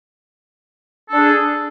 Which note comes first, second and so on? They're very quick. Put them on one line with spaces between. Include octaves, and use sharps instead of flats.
A4 D4 G#4